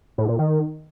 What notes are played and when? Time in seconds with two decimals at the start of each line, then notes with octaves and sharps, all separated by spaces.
0.18 A2
0.28 A#2
0.39 D#3